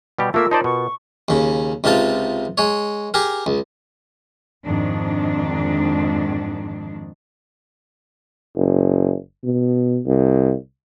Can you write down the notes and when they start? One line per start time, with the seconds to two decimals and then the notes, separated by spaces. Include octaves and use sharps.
0.18 B2 G3 G4
0.34 A3 A#3 F4 A#4 E5 E6
0.51 D#4 C5 D5 A5
0.64 B2 C#6
1.28 D#2 C#3
1.84 C#2 C3 D#4 F4 A5
2.58 G#3 C#5
3.14 G4 G#4 A#4
3.46 C#2
4.64 F2 G#2 D#3 D4
8.55 F#1
9.44 B2
10.06 C2